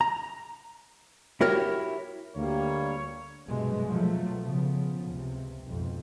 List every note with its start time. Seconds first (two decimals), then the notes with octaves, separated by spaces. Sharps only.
0.01 A#5
1.41 E4 F#4 G4 A#4 C#5
2.36 D2 G3 A#3 C#5
3.46 C2 G2 B2 F#3 G#3 A3
3.90 B2 F3 F#3 A3
4.43 C#3 F3 B3
5.09 C#2 C3
5.66 B1 F2 G#2